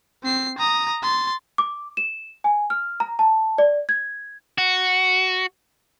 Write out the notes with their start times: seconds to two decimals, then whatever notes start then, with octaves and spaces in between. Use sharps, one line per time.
0.24 C4 C7
0.58 A#5 D#6
1.03 C6 A6
1.58 D6
1.97 E7
2.44 G#5
2.70 F6
3.00 A#5
3.19 A5
3.58 D5
3.89 G#6
4.58 F#4